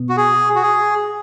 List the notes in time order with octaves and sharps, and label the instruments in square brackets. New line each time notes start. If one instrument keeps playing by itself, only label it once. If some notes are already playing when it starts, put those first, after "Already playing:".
Already playing: [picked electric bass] B2 B3
[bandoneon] F#4
G#4
F#4
G#4